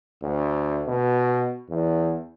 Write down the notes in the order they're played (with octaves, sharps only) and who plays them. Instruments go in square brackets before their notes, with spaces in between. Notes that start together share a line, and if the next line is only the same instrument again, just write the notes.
[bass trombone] D2
B2
E2